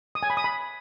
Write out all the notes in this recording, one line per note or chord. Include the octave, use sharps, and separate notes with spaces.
D#6
G#5
B5
D#6
B5